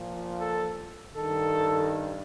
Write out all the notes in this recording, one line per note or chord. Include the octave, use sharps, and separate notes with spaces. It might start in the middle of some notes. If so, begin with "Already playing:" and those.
Already playing: A#2 F3
A4
G2 D#3 A4